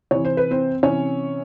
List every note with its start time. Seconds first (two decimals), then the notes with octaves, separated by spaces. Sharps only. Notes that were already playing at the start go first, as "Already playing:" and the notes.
0.11 C3 E3 C#5
0.25 C5
0.37 B4
0.51 C4 C5
0.83 C3 E3 C#4 C#5